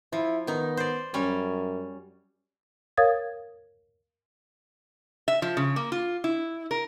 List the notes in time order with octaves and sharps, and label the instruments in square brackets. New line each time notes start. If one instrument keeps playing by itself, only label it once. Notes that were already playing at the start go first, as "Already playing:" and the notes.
[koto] F3 [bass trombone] E4
[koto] D#3 D#4 [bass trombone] B3
[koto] C5 D5
[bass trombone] F#2 [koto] G3 C#4
[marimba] A#4 C#5 F5 D#6 G#6 A6
[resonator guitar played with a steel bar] E5
F3
C#3
A#3
F4
E4
A#4